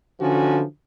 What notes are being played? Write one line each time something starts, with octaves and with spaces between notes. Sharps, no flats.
D3 E3 F3 C#4 F#4